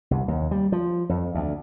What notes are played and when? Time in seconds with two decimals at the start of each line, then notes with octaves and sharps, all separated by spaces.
0.11 C2
0.28 D#2
0.51 G3
0.72 F3
1.09 F2
1.35 D2